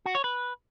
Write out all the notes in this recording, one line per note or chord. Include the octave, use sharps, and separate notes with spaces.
F#4
C#5
B4